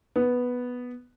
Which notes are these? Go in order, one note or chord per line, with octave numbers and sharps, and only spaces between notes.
B3